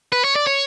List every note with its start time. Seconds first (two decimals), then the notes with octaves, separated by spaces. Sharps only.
0.12 B4
0.24 C#5
0.36 D5
0.47 C#5